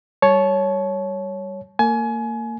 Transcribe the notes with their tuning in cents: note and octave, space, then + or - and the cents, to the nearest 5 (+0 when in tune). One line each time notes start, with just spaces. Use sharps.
G3 +0 C#5 +0 A5 -25
A#3 -30 G#5 +30